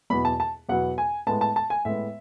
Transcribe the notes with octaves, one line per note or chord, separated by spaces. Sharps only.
E2 B2 F#3 B3 B5
A5
A5
E2 B2 F#3 B3 F#5
G#5
A2 G#3 B3 A5
A5
A5
G#5
A2 G#3 B3 E5